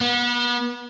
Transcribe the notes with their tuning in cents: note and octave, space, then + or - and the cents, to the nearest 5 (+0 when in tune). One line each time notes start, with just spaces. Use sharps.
B3 -35